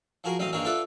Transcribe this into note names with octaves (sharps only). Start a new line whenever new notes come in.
F3 F#4 G#4 A#4
A1 F#3 C4 D#5 F5 D#6
G2 D#3 A#3 C4 G#4 C#5
F4 A4 B4 D5 E5 F#5